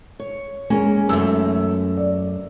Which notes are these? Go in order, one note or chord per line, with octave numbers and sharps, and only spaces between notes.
C#5
G#3 A#3 C#4 G#5
F#2 A3 E6
D5